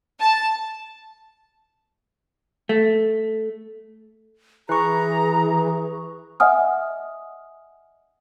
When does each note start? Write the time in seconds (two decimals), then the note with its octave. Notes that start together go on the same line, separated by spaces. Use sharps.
0.20 A5
2.69 A3
4.69 E3 G#4 B4 A#5 C#6
6.40 D#5 E5 F#5 G#5 D#6 F6